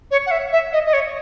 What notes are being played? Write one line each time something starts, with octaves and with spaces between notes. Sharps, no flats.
C#5
F#5
E5
E5
D#5
D#5
C#5